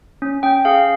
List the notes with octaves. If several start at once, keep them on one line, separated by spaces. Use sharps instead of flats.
C#4
C#4 G5
G#4 F5